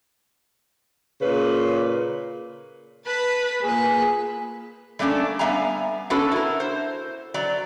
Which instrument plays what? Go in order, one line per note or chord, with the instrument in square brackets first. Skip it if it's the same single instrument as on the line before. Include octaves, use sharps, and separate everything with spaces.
[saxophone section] A#2 C#3 B4
[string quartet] B4 A5 B5
[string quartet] A#2 B4 [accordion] G#4
[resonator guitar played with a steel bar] G3 A3 A#3 C#4 D4
G3 B3 E5 F5 G#5 A#5
B3 C#4 D4 F#4 A4 B4
E4 A#4
C5
F#3 D5 A#5